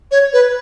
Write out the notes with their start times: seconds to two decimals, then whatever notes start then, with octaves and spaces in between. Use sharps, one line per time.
0.12 C#5
0.33 B4